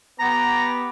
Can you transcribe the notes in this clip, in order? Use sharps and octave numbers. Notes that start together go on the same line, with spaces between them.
B3 G4 A#5